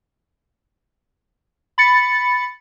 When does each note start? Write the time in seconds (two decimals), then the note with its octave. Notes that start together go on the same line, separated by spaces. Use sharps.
1.78 B5 A6 C#7